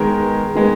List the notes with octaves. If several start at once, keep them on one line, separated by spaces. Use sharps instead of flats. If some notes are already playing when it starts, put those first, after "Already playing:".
Already playing: D#3 G#3 B3 A#4
D#3 G#3 B3